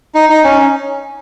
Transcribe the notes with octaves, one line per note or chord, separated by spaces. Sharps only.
D#4
D#4
C#4